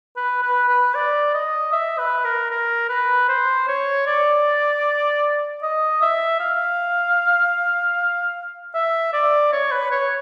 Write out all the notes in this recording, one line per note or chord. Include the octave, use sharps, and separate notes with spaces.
B4
B4
B4
D5
D#5
E5
B4
A#4
A#4
B4
C5
C#5
D5
D#5
E5
F5
E5
D5
C#5
B4
C#5